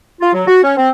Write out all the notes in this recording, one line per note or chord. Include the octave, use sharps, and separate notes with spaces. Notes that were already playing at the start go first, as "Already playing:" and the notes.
F4
F#3
F#4
C#4
C4